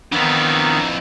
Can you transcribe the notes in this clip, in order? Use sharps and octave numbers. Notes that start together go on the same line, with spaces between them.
F2 D#3 E3 B3 D4 A#5